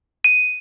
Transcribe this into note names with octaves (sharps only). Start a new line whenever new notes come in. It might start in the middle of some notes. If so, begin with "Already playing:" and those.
D#7